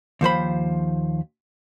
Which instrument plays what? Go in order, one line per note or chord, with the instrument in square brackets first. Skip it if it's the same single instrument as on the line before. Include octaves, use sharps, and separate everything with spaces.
[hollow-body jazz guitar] D#2 F3 C5 B5